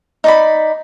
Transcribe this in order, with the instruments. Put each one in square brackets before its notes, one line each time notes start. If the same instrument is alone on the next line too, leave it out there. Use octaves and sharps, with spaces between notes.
[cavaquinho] D#4 D5 B5